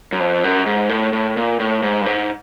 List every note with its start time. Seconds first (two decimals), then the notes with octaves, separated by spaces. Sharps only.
0.13 F#2
0.20 F2
0.44 F#2
0.66 G#2
0.89 A2
1.13 A2
1.37 A#2
1.59 A2
1.83 G#2
2.01 G2
2.06 G#2